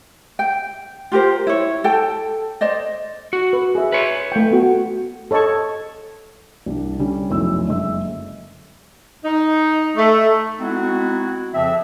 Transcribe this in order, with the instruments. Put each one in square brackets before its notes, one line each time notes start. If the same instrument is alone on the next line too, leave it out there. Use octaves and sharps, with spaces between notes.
[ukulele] G5
F4 G4 A#4 C5
E4 C#5
A4 G5 A5
C5 D5 D#5
[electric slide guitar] F#4
[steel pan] B4
G#4 E5
[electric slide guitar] B4 C#5
[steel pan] A3 G5
B3 F#4
A4 C#5 D#5 A5 C#6
[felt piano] C2 D4
D3 G3 C#4
F1 B1 E4 E6
F#1 D3 G#3 E5 E6
[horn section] D#4
A3
[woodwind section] G#3 B3 C4 D#4 E4 F#4
F2 C#3 F3 C4 E5